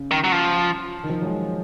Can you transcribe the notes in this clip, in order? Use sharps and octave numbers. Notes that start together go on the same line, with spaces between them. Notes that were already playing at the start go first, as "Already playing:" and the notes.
Already playing: C#3
D#3
F#3
F3
D#3
F3
F#3
G#3